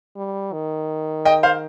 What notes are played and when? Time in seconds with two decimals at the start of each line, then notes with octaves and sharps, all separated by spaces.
0.16 G3
0.53 D#3
1.25 D#5 G5
1.43 C5 F5